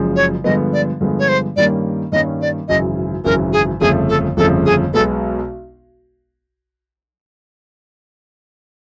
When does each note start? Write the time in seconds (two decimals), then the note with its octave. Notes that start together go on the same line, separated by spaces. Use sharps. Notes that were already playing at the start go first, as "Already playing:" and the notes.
Already playing: F#1 F#2 C#3 F3 G#3
0.16 C#5
0.44 G2 D3 F3 G#3 B3 D#5
0.73 D5
1.01 G2 D3 F3 G#3 B3
1.19 C#5
1.28 C5
1.57 G2 D#3 G3 A#3 C#4 D5
2.12 G2 D#3 G3 A#3 C#4 D#5
2.41 D5
2.68 G#1 F#2 C#3 E3 D#5
3.24 G#1 F#2 C#3 E3 A#4
3.53 G#4
3.81 G1 F2 C#3 F3 A3 G#4
4.09 A4
4.37 G1 F2 C#3 F3 A3 A4
4.66 G#4
4.94 B1 B2 G#3 B3 A4